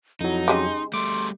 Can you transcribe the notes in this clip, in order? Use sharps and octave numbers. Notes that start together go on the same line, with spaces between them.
F2 F#3 D#4 E4
C#3 G#3 G4 C6
G3 A3 C6 D6